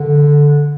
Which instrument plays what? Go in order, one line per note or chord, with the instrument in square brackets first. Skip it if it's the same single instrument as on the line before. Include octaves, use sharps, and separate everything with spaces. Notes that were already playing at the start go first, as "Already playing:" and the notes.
Already playing: [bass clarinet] D3